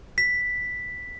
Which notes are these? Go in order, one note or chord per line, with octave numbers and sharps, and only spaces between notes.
B6